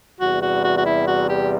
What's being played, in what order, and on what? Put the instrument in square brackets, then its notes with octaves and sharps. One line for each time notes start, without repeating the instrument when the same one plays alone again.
[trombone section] E2 C3 G3 [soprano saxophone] F#4
[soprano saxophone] F#4
F#4
F#4
E4
F#4
G4